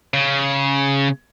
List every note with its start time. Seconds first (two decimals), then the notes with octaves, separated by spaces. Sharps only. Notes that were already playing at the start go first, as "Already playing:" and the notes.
0.14 C#3